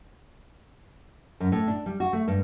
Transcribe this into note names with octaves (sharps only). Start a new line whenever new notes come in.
F#2
A2
D4
G3
F#4
A3
G2